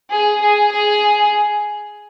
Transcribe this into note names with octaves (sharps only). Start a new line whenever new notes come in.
G#4
G#4
G#4